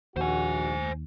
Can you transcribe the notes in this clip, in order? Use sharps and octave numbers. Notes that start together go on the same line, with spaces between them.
A#1 D#2 F#4 C5 G#5